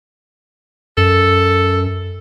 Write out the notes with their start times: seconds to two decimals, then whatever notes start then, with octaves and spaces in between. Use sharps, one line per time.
0.97 F#2 A4